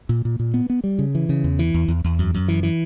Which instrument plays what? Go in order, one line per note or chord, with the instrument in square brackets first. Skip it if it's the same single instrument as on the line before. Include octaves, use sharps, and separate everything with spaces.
[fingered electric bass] A#2
A#2
A#2
B3
B3
G3
C#3
E3
C#3
E2
E3
E2
E2
E2
F#2
F#2
E3
E3